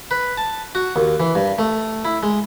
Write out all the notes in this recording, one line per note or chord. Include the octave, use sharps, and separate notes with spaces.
B4
A5
F#4
D#2
E3
G2
A3
E4
G#3